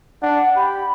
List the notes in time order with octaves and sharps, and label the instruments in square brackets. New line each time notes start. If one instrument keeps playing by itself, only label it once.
[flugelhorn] D4 [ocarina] F#5
[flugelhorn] G4 [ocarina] B5